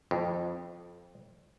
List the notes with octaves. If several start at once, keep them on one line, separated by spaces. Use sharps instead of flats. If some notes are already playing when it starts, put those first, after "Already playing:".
F2